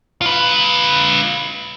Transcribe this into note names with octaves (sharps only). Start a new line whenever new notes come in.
F4 B4